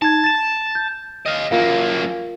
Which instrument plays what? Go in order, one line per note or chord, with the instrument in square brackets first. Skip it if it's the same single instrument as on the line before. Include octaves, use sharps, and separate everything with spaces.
[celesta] D#4 G#6 [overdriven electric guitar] A5
[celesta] A6 E7
G6
[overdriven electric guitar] D#5 F5
[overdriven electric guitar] F#2 A#3 [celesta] F4 A#4 F5